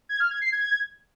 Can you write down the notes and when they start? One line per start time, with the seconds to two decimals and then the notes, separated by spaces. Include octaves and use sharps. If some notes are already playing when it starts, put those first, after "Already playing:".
0.09 G#6
0.20 F6
0.31 G#6
0.41 C7
0.52 G#6